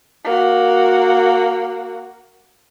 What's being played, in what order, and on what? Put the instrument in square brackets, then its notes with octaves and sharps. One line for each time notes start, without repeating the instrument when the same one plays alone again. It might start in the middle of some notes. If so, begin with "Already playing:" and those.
[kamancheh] A#3 F#4